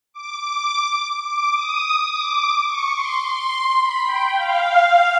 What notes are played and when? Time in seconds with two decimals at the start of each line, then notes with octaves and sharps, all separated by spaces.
0.13 D6
0.40 D6
1.26 D6
1.53 D#6
2.09 D6
2.66 C#6
2.94 C6
3.22 C6
3.78 B5
4.05 G5
4.35 F5